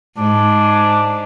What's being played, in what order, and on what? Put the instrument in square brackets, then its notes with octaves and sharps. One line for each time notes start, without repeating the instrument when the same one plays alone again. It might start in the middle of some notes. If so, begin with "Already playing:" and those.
[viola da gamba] G#2 [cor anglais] D4